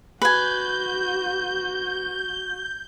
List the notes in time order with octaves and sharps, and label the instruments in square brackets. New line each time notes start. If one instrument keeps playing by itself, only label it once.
[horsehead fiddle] F#4 [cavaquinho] B4 G#5 [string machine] G6